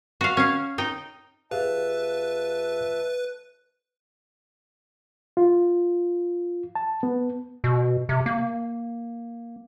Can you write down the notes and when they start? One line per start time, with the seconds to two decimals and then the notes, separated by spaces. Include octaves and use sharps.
0.21 F#4 F5
0.37 C#4 F5
0.78 D#4 G5
1.51 F2 G4 G#4 B4 E5 F5 A5
5.37 F4
6.75 A5
7.03 B3
7.64 B2
8.09 C3
8.26 A#3